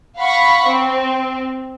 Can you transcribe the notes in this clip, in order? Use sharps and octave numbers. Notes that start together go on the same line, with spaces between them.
F5 F#5 B5 C#6
C4